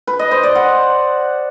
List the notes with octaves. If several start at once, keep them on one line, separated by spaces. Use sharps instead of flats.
B4
D#5
C5
D5
F#5